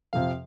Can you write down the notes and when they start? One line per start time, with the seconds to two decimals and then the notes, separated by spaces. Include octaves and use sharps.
0.13 F2 C3 F3 F5